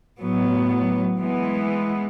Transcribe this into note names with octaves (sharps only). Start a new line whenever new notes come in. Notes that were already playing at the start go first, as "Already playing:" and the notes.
A2 F#3 B3
E3 G#3 B3